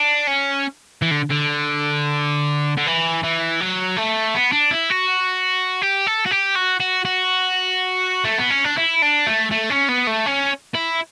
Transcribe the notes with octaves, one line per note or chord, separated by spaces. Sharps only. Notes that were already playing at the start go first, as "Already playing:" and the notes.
Already playing: D4
C#4
E3
D3
D3
D3
E3
E3
F#3
A3
B3
D4
E4
F#4
G4
A4
F#4
G4
F#4
F#4
F#4
A3
B3
C#4
D4
E4
D4
A3
A3
C#4
B3
A3
C#4
E4